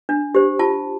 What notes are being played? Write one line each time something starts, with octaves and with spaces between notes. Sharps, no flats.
D4
G4 C5
F4 A5